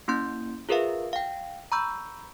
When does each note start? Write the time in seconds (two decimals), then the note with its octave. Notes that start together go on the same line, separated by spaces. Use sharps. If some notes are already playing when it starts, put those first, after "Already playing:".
0.08 A#3 C#4 E4 C6 G6
0.69 F4 G#4 A#4 B4 E5 F5
1.13 F5 G5
1.72 A#5 B5 C#6 E6 G6